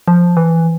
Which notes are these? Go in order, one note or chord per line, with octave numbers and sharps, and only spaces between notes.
F3
E3